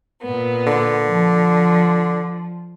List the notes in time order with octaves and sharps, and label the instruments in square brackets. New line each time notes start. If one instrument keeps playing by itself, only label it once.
[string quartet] A#2 B3
[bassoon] D3
[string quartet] F3